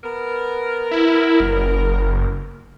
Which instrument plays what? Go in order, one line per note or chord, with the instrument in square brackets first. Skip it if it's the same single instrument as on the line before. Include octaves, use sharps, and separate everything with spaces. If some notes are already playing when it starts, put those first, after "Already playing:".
[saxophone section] B3 A#4
[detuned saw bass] E4
F#1